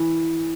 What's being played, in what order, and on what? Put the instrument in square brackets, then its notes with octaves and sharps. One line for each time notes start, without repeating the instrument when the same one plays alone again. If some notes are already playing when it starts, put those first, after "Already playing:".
Already playing: [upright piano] E3